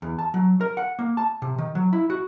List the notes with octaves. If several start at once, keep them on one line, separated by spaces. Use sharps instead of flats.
E2
A5
F#3
A#4
F#5
A#3
A5
C3
D#3
F#3
E4
F#4